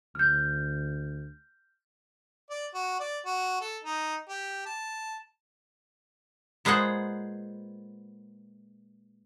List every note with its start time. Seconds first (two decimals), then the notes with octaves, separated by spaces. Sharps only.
0.15 D2 F6 G6
2.50 D5
2.74 F#4
3.00 D5
3.26 F#4
3.61 A4
3.84 D#4
4.29 G4
4.66 A5
6.65 A#2 G#3 B3 G#4 C5 F#5